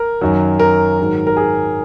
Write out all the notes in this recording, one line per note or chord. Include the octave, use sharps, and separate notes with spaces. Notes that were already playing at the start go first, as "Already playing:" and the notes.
Already playing: A#4
F#2 D#3 F#3
A#4
G#2 D#3 F#3
A#4
G#4